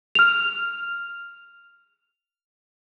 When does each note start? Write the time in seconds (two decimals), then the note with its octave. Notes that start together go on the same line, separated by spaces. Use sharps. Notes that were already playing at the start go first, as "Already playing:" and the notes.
0.15 F6 F7